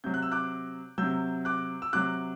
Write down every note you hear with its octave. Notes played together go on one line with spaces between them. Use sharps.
C3 F#3 G6
F#6
E6
D6 F#6
C3 F#3 E6 G6
D6 F#6
E6
C3 F#3 D6 F#6